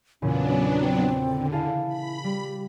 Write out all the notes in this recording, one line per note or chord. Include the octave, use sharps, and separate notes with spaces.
E2 A#2 C#3 F#3 B3 C#4 D4
C4 A#5
D3
E4 G#4 F5 A5
B5
G3 G4